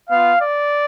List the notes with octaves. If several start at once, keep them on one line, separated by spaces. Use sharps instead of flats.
B3 F4 F5
D5